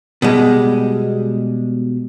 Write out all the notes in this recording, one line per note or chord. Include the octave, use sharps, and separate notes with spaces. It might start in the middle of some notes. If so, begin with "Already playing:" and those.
B2 G3 G#3